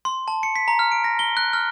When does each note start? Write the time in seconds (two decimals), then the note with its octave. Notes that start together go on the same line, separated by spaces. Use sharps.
0.05 C6
0.28 A5
0.43 C#7
0.56 B6
0.68 A#5
0.79 F6
0.92 D7
1.04 A#6
1.19 G7
1.37 F#6
1.53 F6